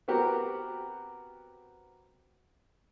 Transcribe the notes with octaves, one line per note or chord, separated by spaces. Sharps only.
B3 C4 F#4 G4 A#4